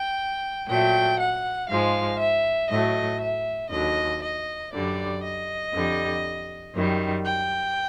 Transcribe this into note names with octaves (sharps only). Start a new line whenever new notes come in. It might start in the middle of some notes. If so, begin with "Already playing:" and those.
Already playing: G5
A#2 F#3 A3 G5
F#5
G#2 F3 G#3 F5
E5
A2 F#3 A3 D#5
E5
D#2 D3 F#3 D#5
D#5
F#2 D3 G3 D5
D#5
F2 D3 G3
F#2 D#3 G3
G5